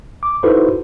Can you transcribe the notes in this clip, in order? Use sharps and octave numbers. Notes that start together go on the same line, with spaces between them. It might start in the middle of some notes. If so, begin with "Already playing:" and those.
D6
D#4 E4 F#4 A4 B4 C5